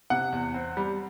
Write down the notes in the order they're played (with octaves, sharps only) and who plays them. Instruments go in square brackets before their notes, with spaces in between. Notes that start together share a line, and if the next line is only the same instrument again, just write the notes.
[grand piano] C3 F#5
E2
C4
G3